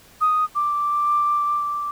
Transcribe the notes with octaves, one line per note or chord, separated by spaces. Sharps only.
D#6
D6